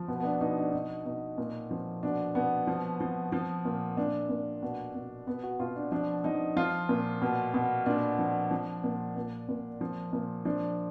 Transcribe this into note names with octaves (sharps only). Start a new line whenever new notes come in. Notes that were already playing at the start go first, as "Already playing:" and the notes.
Already playing: F3
B2 B3
B3
D4
B2 D#4
D4
B2 D#4
B2 D#4
A#2
F3
B2 D4
B2 B3
F3
F3
F3
A#2
A#2 D4
A#2
B2
B2
B2 B3
F#4
B2 F4
D4
F3 D4
F3 D#4
F3 F4
A#2
B2
B2
A#2 D4
F3
F3
A#2
A#2
A#2
F3
A#2
F3 D4